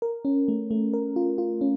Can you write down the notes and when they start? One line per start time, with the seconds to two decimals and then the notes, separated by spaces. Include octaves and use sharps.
0.02 A#4
0.25 C#4
0.48 A3
0.71 A3
0.93 A#4
1.16 F4
1.38 F4
1.61 C#4